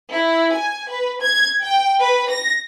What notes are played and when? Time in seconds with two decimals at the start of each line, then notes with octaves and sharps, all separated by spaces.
0.14 E4
0.55 G#5
0.90 B4
1.22 G#6
1.63 G5
2.01 B4
2.30 A#6